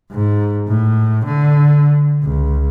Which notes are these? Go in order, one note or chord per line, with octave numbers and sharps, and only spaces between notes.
G#2
A2
D3
C#2